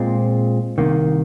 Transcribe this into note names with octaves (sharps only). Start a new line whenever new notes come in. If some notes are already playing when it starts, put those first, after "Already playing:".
Already playing: A#2 G#3 C4 F4
C2 C3 D#3 A#3